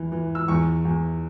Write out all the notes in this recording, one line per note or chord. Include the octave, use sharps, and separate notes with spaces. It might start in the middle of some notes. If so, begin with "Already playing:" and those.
Already playing: E2 E3
E3
E6
E2 C#6
E2